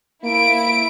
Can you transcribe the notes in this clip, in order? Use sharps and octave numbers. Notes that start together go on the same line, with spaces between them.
A#3 E4 D7